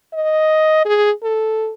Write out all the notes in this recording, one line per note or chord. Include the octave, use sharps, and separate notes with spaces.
D#5
G#4
A4